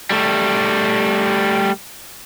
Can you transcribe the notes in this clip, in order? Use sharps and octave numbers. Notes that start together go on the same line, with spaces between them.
G3 A3